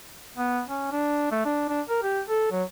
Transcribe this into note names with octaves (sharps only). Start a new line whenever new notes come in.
B3
C#4
D4
A3
D4
D4
A#4
G4
A4
F#3